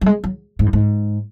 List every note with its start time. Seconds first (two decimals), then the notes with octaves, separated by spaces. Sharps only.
0.01 F#3
0.06 G#3
0.24 F#3
0.59 G#2
0.66 F#2
0.73 G#2